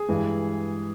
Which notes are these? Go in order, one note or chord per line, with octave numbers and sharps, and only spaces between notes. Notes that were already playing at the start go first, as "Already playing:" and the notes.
Already playing: G#4
G2 E3 G#3